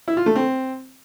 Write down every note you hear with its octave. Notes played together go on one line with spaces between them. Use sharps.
E4
F4
A3
C4